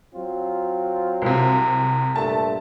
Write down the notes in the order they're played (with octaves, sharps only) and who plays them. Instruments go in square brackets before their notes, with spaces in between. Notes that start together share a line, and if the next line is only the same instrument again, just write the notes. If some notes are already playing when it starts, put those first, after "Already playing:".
[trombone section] F#3 C4 F4
[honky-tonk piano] C2 C3
[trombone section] G2 A#2 A3 [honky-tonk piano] A5